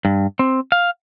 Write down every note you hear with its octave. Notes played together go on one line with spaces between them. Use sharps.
G2
C4
F5